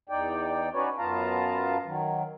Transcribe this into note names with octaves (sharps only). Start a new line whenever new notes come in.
E2 D#4 D5 G5
C#4 D#4 F#4 B4 C#5 D5
F#2 B3 F4 F5 A5 A#5
D#3 F#3